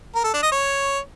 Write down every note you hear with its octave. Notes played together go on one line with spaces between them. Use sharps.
A#4
A4
D4
D#5
C#5